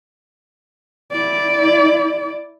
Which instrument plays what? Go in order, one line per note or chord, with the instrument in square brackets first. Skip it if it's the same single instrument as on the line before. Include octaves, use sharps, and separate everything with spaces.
[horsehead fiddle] E4 D5